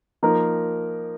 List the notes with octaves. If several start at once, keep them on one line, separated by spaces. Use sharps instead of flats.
F3 A#3 D#4 A#4